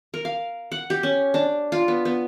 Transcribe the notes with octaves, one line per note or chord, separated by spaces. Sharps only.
A#4
F5
F#5
G4
C#4
D4
F4
B3
B3